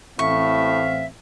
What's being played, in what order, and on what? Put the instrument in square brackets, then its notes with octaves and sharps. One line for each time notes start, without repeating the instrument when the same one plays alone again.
[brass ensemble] A1 C4 F5 [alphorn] A2 [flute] E5 [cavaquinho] C#6